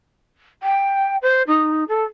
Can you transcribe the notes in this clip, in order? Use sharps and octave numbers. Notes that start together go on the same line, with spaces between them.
G5
C5
D#4
A4